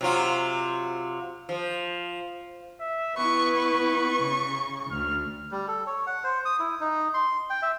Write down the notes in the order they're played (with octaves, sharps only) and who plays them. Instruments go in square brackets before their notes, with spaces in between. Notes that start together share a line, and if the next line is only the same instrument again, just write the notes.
[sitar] C3 F#3 F4
F3
[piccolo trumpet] E5
[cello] B3 E4 [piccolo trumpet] B4 [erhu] C#6
[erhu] C#6
[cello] C#3
[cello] D2 [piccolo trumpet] F6
[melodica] G3
A4
C#5
F#5
C5
D#6
E4
D#4
C6
G5
E5